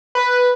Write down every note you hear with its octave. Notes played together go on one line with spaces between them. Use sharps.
B4